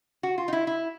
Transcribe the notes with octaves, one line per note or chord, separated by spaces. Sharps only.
F#4
F4
D#4
E4
E4